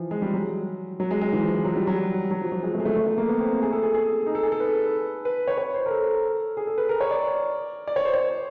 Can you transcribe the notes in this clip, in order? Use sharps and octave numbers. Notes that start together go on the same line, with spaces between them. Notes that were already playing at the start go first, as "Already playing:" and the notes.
Already playing: E3 F3
G#3
G3
F#3
F#3
G#3
G#3
E3
F3
F3
F#3
G3
F#3
F#3
F3
F#3
G#3
A3
G#3
A3
A3
A3
A#3
B3
C4
G#4
A4
G#4
G#4
D#4
A4
G#4
A4
B4
B4
C#5
C#5
C5
A#4
A4
G#4
A4
B4
A#4
C#5
D5
D5
C#5
C5
C#5